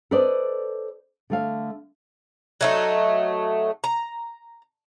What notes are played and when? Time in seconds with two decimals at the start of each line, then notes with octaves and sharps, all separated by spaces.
0.11 A4 B4 C5 D5 D#5
1.30 D3 A3 F5
2.61 F#3 A3 D#4
3.84 A#5